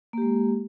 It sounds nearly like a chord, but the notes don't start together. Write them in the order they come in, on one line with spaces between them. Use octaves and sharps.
A#3 G4 G#3